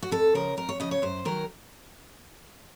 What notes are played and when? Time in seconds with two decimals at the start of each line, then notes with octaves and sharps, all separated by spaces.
0.03 F#4
0.11 F2 A4
0.35 C#3 F3 A#4
0.57 F2 A#4
0.69 C#5
0.80 C#3 F3 D#5
0.91 C#5
1.02 F#2 C5
1.25 D#3 F#3 A#4